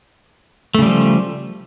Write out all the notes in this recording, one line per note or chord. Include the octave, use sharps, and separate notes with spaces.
C#3 F3 G3 A3